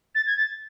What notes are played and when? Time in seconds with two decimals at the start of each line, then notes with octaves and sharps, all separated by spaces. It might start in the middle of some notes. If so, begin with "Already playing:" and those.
0.14 A6
0.26 G#6
0.37 A6